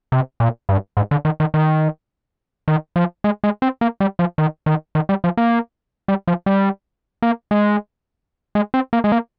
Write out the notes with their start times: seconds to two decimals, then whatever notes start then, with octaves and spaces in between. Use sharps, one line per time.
0.12 C3
0.40 A#2
0.69 G2
0.97 G#2
1.11 D3
1.25 D#3
1.40 D#3
1.54 D#3
2.68 D#3
2.96 F3
3.24 G#3
3.44 G#3
3.62 C4
3.81 A#3
4.00 G3
4.19 F3
4.38 D#3
4.66 D#3
4.95 D#3
5.09 G3
5.24 F3
5.37 A#3
6.08 G3
6.27 F3
6.46 G3
7.22 A#3
7.51 G#3
8.55 G#3
8.74 C4
8.93 A#3
9.04 G#3
9.12 A#3